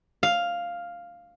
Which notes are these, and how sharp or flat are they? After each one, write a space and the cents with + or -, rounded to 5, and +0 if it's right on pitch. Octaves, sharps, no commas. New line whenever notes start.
F5 +0